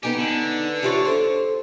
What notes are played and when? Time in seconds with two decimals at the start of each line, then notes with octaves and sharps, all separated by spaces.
0.03 B3 D#4 G4 G#5
0.18 D3
0.83 E3 F4 G4 C#5
1.05 A4 C5